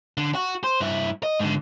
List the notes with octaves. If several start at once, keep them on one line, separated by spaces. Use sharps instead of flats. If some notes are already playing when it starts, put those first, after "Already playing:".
D3
F#4
C5
G2 E4
D#5
G#2 D3